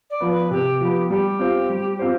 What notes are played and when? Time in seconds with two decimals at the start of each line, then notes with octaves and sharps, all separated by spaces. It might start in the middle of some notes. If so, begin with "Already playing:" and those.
0.10 D5
0.20 F3 B3
0.31 B4
0.51 C3 G4
0.81 F3 B3
1.10 G3 G4
1.39 C4 F4 C5
1.70 G3
1.99 C4 F4 C5